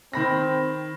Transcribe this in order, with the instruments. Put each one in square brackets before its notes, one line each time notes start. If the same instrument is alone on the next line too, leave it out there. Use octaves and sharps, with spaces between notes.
[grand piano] D#3 B5 A#6 [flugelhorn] C4